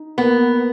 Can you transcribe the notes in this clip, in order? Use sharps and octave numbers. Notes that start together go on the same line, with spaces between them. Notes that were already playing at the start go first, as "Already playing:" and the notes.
Already playing: D#4
A#3 B3